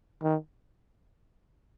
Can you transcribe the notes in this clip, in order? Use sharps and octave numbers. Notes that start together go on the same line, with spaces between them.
D#3